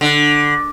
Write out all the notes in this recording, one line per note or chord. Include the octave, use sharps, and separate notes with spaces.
D3